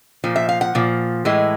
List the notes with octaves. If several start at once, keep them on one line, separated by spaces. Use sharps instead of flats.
A#2 F3
E5
F5
F#5
A#2 F3
A2 E3 G#3